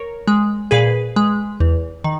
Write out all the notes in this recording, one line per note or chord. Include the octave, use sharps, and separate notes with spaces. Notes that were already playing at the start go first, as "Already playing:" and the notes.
Already playing: A#4 C#5
G#3
A#2 G#4 B4
G#3
E2
D#3